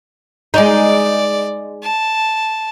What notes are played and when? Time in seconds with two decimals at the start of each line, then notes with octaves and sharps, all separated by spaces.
0.54 G#3 D#4 D5
1.83 A5